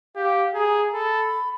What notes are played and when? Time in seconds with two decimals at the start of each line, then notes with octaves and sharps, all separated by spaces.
0.16 G4 F5
0.54 G#4 A#5
0.93 A4 B5